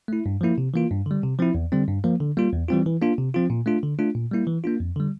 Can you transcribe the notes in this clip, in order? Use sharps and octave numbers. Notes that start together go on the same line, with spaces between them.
A3 E4
G2
F3 A#3 E4
C3
E3 A#3 F4
G2
D3 G3
C3
F3 C4 E4
E2
D3 G3 C4
G2
F3 A#3
D3
G3 A#3 F4
E2
E3 G3 C4 F4
E3
A#3 D4 F4
C3
F3 C4 F4
A#2
A3 D4 F4
D3
A3 D4 F4
A#2
G3 A#3 E4
E3
A#3 D4 F4
F2
D3 G3